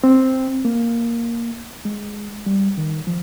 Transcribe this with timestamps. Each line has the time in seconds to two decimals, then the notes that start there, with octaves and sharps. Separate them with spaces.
0.04 C4
0.65 A#3
1.85 G#3
2.46 G3
2.77 D#3
3.07 F3